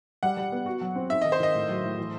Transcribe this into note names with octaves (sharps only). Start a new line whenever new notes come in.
G3 F#5
G3
B3
F#4
F#3
C4
D#4 E5
D#3 D#5
C5
D#3 D#5
A2
F#3
A2
E3